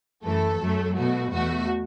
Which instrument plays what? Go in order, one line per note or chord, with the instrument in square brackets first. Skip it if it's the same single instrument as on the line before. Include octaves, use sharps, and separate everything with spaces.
[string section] F#2 E3 A3 A4
F#2 F#3 A3
B2 A3 F#4
E2 B2 A3 F#4